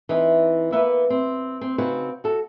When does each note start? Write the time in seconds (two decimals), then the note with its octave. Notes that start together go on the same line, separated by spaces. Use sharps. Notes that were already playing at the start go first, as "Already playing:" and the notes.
0.09 E3 C4 D#4
0.72 A#3 B3 B4 E5
1.10 C4
1.61 C4
1.78 C#3 C4 D#4 F#4 B4
2.24 F#4 A4